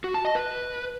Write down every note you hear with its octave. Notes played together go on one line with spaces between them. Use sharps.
F#4
A5
D#5
B4